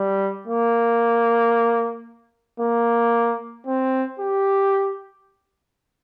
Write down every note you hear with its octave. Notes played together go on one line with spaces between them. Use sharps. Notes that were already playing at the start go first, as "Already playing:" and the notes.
Already playing: G3
A#3
A#3
C4
G4